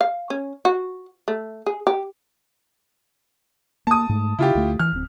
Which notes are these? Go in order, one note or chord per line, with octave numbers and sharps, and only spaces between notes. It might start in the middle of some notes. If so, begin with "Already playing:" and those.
F5
C#4
F#4
A3
G#4
G4
A#3 A5 D#6
G#2 A3
C#3 E4 F4 G4
D2 A3
E3 F6
D1 C4